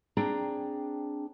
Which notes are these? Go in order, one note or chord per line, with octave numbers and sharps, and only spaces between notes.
C4 D4 G#4 G5 A#5